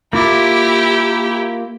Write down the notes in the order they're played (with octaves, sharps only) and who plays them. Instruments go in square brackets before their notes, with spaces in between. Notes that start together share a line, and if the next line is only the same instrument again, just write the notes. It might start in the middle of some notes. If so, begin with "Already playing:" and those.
[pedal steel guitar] A#3 F4 D6 [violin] E4 G4